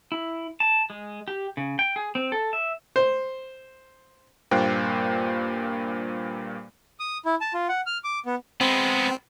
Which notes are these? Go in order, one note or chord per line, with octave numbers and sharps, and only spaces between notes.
E4
A5
G#3
G4
C#3
G5
G#4
C4
A4
E5
C5
G2 A#2 A#3 C5 G5 F#6
D#6
E4
A5
F4
F#5
F6
D6
B3
G#3 B3 C4